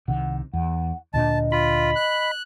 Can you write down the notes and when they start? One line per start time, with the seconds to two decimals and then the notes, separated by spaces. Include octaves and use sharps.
0.08 C2 C3 D#3 F#5
0.53 E2 F#5
1.14 D2 A#2 D4 D#5 A5
1.52 F4 B5
1.96 F#6